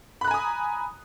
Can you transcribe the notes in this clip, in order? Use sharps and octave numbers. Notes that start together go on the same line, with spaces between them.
G#5 A#5 B5 D#6 F#6